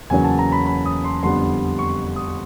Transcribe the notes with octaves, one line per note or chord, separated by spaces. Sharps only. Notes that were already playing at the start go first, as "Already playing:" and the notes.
E2 C#3 F#3 A#3 C#4 G#5
A5
A#5
B5
B5
D#6
C6
F2 D3 G3 B3 C6
C#6
D#6